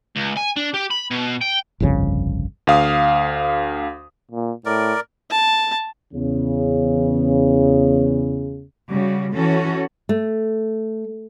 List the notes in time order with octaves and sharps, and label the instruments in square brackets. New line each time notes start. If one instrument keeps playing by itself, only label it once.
[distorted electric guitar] C#2
G#5
D4
G4
B5
B2
G5
[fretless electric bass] G1 C2 F2 C#3
[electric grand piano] D2 F5 D#6
[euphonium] A#2
[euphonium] A2 [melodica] A#4 D5
[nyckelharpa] A5
[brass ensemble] E2 C#3
[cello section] C#3 G3 F#4
E3 C#4 F#4 A4
[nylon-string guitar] A3